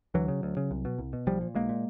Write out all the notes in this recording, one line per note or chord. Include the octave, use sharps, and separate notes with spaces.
D2 E3 F#3
C#3
D2
C#3
C2
B2
C2
B2
B1 F3 G3
A#2
B1 G#3 A#3
A#2